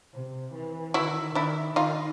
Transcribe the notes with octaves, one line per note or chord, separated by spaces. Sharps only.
C3
E3
D#3 E4 F#4
D#3 D4 E4
D#3 D#4 F4